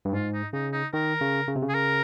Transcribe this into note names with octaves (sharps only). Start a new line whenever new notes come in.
G2
G#2 F4
D#4
C#3 D#4
D#4
D#3 A#4
C#3
C#3
C3
C#3
G#4
A#4